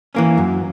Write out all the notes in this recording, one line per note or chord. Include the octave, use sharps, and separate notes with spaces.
E3 A#3 C#4
F#2